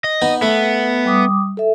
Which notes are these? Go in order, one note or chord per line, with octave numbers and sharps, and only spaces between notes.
D#5
B3 D#4
A3 B3
G3 D6 D#6
A4 E5